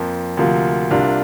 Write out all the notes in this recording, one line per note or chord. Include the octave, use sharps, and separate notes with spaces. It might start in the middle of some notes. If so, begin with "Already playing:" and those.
Already playing: F2 F3 A#3
D2 C3 F3 A#3 F4
C2 C3 A#3 D4 F4